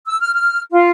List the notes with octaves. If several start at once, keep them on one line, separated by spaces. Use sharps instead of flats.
E6
F6
F6
F4